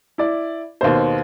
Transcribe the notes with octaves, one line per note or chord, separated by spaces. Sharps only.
E4 D5
D#2 B2 C5